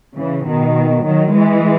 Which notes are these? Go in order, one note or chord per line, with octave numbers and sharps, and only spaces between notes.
C#3 E3
B2 D#3
D#3 F#3
E3 G#3